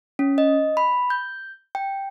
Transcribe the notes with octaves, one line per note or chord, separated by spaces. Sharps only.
C#4
D#5
B5
G6
G5